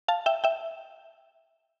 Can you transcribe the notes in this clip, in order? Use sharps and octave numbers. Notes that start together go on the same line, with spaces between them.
F5 A5
E5 G5
E5 G5